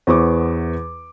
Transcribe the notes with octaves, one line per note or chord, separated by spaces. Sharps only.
E2 B3 E4 C5 C#6 D6